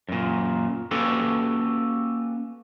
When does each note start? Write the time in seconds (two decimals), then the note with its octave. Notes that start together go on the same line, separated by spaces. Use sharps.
0.09 F#2 A#2
0.91 A#3 C#4 F#4 G4 A4 B4